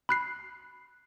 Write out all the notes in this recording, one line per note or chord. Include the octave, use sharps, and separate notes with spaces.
B5 F#6 C7